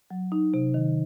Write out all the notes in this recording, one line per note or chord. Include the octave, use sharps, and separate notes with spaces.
F#3
D#4
C3
D#3